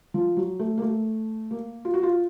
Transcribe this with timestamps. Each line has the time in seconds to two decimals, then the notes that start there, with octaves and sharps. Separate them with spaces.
0.14 F3
0.37 F#3
0.59 A3
0.78 A#3
0.82 A3
1.51 A#3
1.85 F4
1.94 F#4
2.03 F4